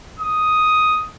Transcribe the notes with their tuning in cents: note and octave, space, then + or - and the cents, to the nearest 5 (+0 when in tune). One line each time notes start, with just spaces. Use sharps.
D#6 +5